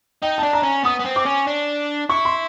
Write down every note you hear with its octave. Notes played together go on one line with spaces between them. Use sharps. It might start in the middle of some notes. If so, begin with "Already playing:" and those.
D#4 G5
A5
D4
A#5
C#4
B3 D#6
B3
C4
D6
C#4
D4
E4 C#6
C6